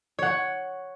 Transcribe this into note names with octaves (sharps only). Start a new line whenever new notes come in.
C#5 F#5